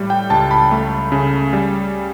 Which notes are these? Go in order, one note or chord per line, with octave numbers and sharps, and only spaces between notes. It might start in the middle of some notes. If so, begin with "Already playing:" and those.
Already playing: A2 G3
G5
C#2 A5
B5
A3
C#3
G3